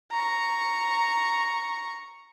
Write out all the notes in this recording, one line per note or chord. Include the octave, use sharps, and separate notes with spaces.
A#5 C#6